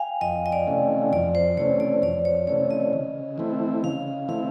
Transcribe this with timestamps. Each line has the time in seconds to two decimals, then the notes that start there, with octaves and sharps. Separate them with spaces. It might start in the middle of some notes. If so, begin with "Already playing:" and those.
Already playing: F5 G5 G#5
0.21 F2 D#5
0.46 D#5
0.52 D5
0.66 C3 E3 A3 C#4
1.13 F2 D5
1.35 C5
1.57 C3 E3 A3 C#4 C#5
1.80 D5
2.02 F2 D5
2.25 C#5
2.47 C3 E3 A3 C#4 C#5
2.71 D#5
2.93 C#3
3.38 E3 A3 C4 E4
3.84 C#3 F5
4.28 E3 A3 C4 E4 F5